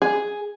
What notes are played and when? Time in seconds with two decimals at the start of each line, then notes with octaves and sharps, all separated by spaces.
0.02 G#4